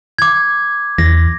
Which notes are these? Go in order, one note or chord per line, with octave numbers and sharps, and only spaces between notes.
D6 G#6
E2 A#6